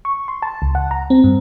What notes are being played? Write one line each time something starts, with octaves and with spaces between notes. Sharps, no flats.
C#6
C6
A5
C#2
F#5
A#5
C4
G2